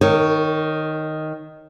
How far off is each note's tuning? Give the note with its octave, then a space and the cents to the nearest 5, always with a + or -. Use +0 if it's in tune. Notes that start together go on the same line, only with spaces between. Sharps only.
D#3 +0 A#4 -40 C#5 +0